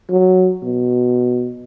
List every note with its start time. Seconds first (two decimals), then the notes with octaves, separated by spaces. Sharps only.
0.11 F#3
0.63 B2